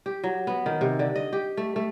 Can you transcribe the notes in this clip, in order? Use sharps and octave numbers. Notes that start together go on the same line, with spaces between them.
G4
F#3
B3
D#3
C3
D3
D#5
G4
A3
A3